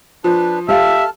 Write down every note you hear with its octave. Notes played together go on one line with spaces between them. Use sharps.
F3 D4 B4
G4 A4 E5 F5 A5 F6